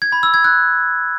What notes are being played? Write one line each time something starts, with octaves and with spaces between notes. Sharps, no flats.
G#6
B5
E6
G#6
F#6